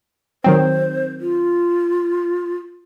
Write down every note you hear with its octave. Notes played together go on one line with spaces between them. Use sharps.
D#3 F#3 C4 C5
F4